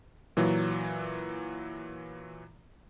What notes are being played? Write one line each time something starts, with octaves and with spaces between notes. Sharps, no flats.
A#2 E3 F#3